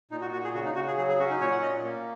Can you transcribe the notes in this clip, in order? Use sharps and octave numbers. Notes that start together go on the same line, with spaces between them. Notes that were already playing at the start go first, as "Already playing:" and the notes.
A#2 D#4
F#4
A#2 F#4
G#4
C#3 F#4
D#4
C#3 F#4
G#4
F#3 G#4
G#4
C#4 F#4
D#4
A#2 C#5
F#5
A#2 D#5
A#3